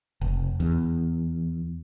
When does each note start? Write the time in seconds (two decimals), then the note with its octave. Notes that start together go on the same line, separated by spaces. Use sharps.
0.21 F1
0.60 E2